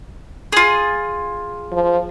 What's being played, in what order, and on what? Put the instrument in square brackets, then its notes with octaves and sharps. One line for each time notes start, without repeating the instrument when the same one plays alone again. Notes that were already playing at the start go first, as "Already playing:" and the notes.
[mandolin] F4 G#4
[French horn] F3